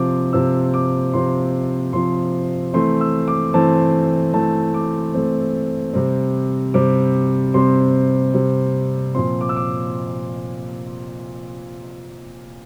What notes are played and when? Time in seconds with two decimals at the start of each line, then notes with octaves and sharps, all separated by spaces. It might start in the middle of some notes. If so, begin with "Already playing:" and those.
Already playing: C3 F3 C4 D6
0.33 C3 F3 C4 E6
0.74 D6
1.13 C3 F3 C4 C6
1.93 C3 F3 C4 C6
2.73 E3 A3 C4 C6
3.01 E6
3.28 D6
3.54 E3 A3 C4 A5
4.33 E3 A3 C4 A5
4.74 D6
5.14 E3 A3 C4
5.93 C3 G3 C4
6.74 C3 G3 C4 D6
7.54 C3 G3 C4 C6
8.34 C3 G3 C4
9.15 A#2 F3 C4 C6
9.41 D6
9.49 E6
9.56 D6